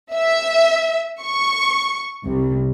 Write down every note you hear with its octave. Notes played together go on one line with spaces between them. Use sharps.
E5
C#6
C2